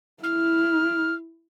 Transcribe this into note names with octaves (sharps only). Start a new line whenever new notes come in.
E4 F6